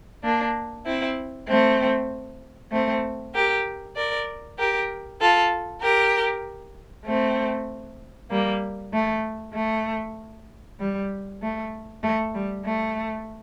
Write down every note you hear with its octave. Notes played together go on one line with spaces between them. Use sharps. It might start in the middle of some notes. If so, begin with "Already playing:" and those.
A#3 D4
C4 E4
A3 C4
A3 C4
G4 A#4
A#4 D5
G4 A#4
F4 A4
G4 A#4
A3 C4
G3 A#3
A3
A3
G3
A3
A3
G3
A3